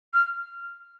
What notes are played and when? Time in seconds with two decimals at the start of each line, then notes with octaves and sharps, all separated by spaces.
0.14 F6